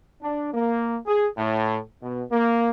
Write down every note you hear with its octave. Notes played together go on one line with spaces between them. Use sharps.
D4
A#3
G#4
A2
B2
A#3